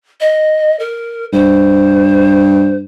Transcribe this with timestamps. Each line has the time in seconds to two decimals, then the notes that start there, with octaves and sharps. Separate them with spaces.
0.21 D#5
0.80 A#4
1.33 G2 C5